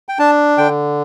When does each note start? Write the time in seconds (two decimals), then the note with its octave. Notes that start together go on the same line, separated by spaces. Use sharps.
0.09 G5
0.19 D4 A5
0.58 D3 G5